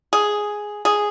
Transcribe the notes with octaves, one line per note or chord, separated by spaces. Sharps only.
G#4
G#4